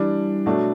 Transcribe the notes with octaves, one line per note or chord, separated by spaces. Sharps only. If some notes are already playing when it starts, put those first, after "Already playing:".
Already playing: E3 G3 D4
B2 F#3 A3 D4